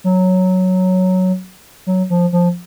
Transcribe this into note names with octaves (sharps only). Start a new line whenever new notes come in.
F#3
F#3
F3
F3